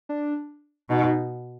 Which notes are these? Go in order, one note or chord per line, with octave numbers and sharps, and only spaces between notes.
D4
B2 D#4